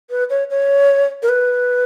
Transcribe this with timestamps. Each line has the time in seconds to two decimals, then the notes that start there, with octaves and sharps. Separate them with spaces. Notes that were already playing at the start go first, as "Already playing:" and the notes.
0.10 B4
0.30 C#5
0.50 C#5
1.23 A#4
1.29 B4